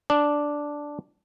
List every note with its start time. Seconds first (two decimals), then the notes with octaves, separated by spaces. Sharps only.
0.10 D4